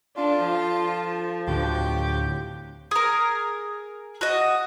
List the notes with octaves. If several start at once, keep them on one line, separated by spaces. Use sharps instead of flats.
D4 F4 A4 A5
F3
D2 A2 D3 F#4 G4 G5
G#4 A#4
F#4 D#5